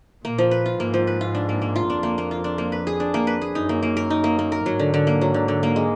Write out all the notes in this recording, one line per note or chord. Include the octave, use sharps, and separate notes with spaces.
A#2 A#3
F3
B4
F4
G#2 A#3
F3
B4
F4
D4
A#3
A#3
F4
F2 D4
A#3
A#3
F4
D4
A#3
B4
G#4
D4
A#3
B4
G#4
F#2 D#4
A#3
A#3
A#4
D#4
A#3
A#3
A#4
G#2 F#3
D3
D3
A#3
F#3
D3
D3
A#3
G#3